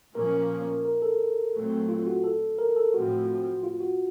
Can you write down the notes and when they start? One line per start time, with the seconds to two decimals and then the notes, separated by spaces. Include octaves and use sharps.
0.15 A#2 F3 A#3 C#4 A#4
0.85 A#4
1.02 A4
1.54 A#2 F#3 A3 C4
1.89 F4
2.07 F#4
2.24 A4
2.58 A#4
2.76 A4
2.94 A2 F3 C4 F#4
3.64 F4
3.81 F#4